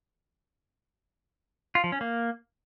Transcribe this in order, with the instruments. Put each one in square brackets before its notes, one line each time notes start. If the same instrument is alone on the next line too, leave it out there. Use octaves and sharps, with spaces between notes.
[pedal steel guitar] F4
F3
C#4
A#3